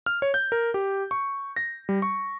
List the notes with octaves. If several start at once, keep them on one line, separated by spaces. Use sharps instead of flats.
F6
C#5
G6
A#4
G4
C#6
A#6
G3
C#6